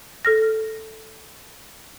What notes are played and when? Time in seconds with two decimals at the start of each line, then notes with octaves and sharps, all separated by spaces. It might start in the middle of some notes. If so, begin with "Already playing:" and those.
0.25 A4 F6 A#6